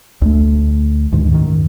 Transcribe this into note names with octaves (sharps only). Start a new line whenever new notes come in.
D2 A3
D2 G#2 D#3
F#2 D#3